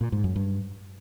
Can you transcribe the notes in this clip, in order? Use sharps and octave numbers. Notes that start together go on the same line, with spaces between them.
A#2
G#2
F#2
G2